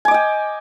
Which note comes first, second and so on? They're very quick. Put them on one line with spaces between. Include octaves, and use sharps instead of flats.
G#5 D6 D#5 G5